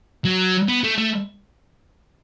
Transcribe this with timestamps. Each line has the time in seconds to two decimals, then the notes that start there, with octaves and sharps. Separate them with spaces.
0.25 F#3
0.68 B3
0.84 A3
0.98 A3